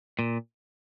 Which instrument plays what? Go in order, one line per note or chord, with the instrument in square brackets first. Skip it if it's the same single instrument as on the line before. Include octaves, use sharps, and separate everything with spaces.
[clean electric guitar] A#2